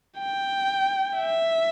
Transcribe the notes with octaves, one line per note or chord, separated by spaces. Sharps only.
G5
E5